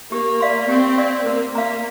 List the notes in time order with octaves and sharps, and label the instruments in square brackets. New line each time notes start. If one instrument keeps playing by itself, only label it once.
[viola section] A#3 [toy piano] G4
[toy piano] D5 F5 C6
[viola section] C4 [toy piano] G4
[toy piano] D5 F5 C6
[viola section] A#3 [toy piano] A#4
[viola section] A#3 [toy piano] F5 A#5